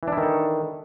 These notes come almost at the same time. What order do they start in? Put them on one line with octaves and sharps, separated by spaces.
E3 D4 E4 D#3 A4